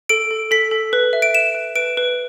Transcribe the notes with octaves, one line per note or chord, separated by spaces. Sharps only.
A4 D7
A4
A4 B6
A4
B4
E5
D7
E5 E7
B4
B4 D7
B4